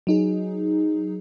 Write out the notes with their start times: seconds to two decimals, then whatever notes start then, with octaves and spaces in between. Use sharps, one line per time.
0.07 F#3 D#4 G#4